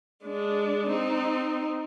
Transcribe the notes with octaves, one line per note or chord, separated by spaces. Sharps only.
G#3 D4
C4 D#4